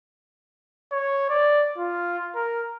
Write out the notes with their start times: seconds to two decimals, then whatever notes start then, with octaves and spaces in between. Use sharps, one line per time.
0.92 C#5
1.29 D5
1.78 F4
2.35 A#4